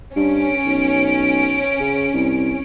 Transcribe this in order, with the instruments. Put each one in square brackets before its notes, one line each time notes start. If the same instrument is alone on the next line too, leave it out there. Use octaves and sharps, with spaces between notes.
[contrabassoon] G2 [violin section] C#4 D7
[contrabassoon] B1
C#3
C2